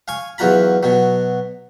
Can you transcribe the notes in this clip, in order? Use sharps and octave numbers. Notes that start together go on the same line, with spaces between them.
F5 G#5 C#6
E2 F#3 F4 A#5 B5
B2 F#3